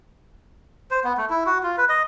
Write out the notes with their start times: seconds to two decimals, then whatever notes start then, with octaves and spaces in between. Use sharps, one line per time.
0.91 C5
1.04 B3
1.18 A3
1.30 E4
1.46 F#4
1.63 F4
1.78 B4
1.89 D#5